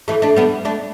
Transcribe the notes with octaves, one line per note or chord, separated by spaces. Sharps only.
E3 A3
A3 D4
G3 B3
A3 D4